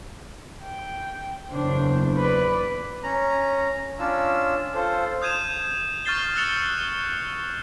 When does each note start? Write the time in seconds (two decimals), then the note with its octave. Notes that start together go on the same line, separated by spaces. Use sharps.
0.63 G5
1.51 F#1 E2 C#3 D4 C5
2.17 B4 D5
3.03 C#4 A#5
3.99 C#4 D4 F4 E6
4.74 F4 A4 C5
5.22 D#6 G6 G#6 D#7 E7
6.05 C#6 F6 G6 A6 C7 G7
6.35 E6 F#6 A6 C#7 F7
6.56 E6